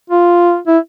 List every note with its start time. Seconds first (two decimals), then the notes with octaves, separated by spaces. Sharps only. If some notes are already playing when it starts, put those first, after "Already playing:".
0.10 F4
0.67 E4